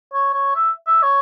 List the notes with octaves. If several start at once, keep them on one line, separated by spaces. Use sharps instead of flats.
C#5
C#5
E5
E5
C#5